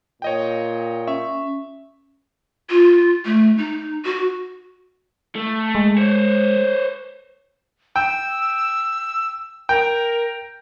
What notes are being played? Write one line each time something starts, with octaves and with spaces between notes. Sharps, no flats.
A#2 C#5 D#5 G5
C#4 E5
F4
A3
D#4
F#4
A3
G#3
C5 C#5
G5 E6
A#4 G5